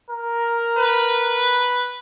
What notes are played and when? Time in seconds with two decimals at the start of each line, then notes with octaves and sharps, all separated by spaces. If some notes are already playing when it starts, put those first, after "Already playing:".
0.10 A#4
0.77 B4